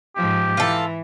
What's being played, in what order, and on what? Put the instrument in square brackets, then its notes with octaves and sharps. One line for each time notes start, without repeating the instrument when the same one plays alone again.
[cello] G#2 F3 [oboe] G4
[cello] E3 [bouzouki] F4 A4